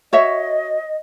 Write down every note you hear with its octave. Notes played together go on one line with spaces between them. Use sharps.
F#4 C#5 D#5 E5